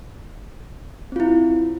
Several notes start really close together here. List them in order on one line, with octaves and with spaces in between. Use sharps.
C4 F4 E4